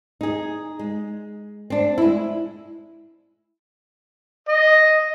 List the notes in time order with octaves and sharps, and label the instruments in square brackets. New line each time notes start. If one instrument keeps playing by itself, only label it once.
[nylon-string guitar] D#4 G#4
G#3
C4 D4
G#3 E4
[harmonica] D#5